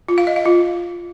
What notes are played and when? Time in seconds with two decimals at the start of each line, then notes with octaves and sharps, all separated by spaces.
0.08 F4
0.18 F5
0.27 D#5
0.36 F5
0.45 F4